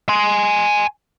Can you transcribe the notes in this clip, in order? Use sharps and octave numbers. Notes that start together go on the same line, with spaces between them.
G#5 C6